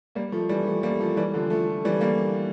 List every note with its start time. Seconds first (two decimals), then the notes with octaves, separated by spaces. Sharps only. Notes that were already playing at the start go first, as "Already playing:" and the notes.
0.15 G3 A#3
0.32 F3 A3
0.49 E3 G3
0.66 F3 A3
0.83 G3 A#3
1.00 F3 A3
1.17 E3 G3
1.34 D3 F3
1.50 F3 A3
1.85 E3 G3
2.01 G3 A#3